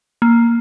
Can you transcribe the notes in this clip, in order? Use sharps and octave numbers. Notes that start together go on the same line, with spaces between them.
A#3